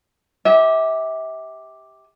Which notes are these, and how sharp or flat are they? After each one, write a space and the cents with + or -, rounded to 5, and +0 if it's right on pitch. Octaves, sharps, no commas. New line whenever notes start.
G4 +0 E5 -35